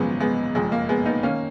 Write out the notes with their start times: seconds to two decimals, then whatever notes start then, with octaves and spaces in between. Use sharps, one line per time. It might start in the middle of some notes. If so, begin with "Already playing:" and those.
Already playing: G#1 F#2 C#3 F3 G#3 B3
0.20 G#3 B3
0.55 F#1 F2 F3 G#3
0.72 A#3
0.89 G#3 B3
1.06 B3 D#4
1.23 D#3 A#3 C#4